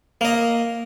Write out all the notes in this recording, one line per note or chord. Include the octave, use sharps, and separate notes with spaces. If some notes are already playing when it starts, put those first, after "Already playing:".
A#3 D#5